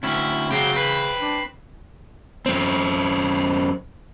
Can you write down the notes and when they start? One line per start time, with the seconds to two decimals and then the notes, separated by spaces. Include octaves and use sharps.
0.03 D2 C4 C#4 E4
0.51 C#3 F#3 C4 G4
0.73 C4 B4
1.21 D4
2.46 F#2 C4